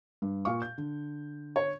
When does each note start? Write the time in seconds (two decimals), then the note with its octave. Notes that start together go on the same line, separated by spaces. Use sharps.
0.22 G2
0.45 A#2 F5 C#6
0.62 G6
0.78 D3
1.56 C#5